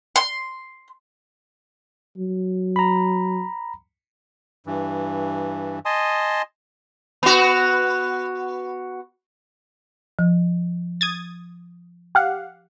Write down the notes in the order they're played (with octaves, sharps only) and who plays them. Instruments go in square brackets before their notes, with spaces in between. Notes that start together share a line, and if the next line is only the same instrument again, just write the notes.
[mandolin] C6
[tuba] F#3
[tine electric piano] A#5 B5
[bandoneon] G2 E3
D#5 G#5 A5 C6 D#6
[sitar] B3 F#4
[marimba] F3
[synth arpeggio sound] D#6 G#6 A6
G4 F5 F#5